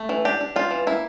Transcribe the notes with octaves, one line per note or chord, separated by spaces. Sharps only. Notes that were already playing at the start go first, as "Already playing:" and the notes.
Already playing: A3
E3
D4 G4
D4
G3 F4
E3
A#3 E4